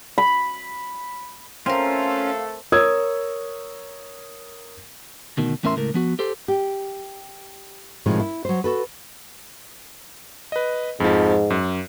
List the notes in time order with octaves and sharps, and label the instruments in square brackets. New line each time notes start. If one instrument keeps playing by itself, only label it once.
[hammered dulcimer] B5
[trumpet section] A3 A4 [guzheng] C4 A#4 [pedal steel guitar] C#4 F4 [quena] F5
[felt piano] A#4 C#5 D#6 E6 G#6
[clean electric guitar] D2 B2 D#3
E2 A2 C#4 A#4 E5 C6
C#2 A2 A#4
F3 B3 F#4
G4 A4 C5
[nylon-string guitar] G4
A2 C3 D#3 F3 G#3
E4
F#3 C5
F#4 A4 B4
[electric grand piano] B4 D#5
[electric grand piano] F2 F3 [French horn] G#2
[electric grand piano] F#2